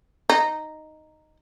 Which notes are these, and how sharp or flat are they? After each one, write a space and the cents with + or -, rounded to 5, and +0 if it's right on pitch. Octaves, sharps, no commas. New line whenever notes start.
D#4 -5